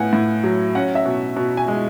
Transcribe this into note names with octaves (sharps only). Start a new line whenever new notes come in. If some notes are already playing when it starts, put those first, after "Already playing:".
Already playing: A2 B3 F#5 G#5
A2
F#3
C#4 F#5
E5
B2
B2
G#5
G#3